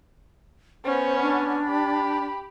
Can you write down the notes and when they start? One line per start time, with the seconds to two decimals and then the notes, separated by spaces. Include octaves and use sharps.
0.85 B3 C#4 C5
1.21 D4
1.65 G4 B5